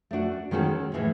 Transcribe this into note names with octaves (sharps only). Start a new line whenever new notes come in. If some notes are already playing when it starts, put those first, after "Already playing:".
A3 D4 F#4
D#3 G#3 C#4 F#4 A4
A2 E3 G#3 C#4